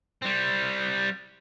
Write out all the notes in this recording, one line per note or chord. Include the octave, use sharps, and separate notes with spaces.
G3 C4